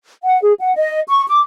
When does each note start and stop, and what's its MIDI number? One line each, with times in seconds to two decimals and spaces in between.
0.22 0.41 78
0.43 0.53 68
0.60 0.74 78
0.75 1.00 75
1.08 1.23 85
1.29 1.40 86